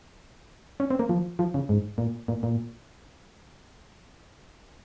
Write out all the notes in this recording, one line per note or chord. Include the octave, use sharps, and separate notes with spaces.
C#4
C4
A#3
F3
F3
C#3
G#2
A#2
A#2
A#2